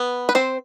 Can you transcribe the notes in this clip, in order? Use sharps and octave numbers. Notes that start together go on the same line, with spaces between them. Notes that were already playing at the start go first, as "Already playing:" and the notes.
Already playing: B3
B4
C4 C5